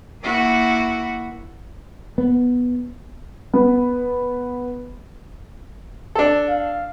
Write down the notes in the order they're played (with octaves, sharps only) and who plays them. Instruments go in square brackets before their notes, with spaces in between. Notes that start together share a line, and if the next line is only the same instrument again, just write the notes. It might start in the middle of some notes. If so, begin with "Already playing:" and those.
[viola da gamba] A#3 E4 F#4
[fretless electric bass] B3
[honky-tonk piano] B3
[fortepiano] D4 A4
[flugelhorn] F5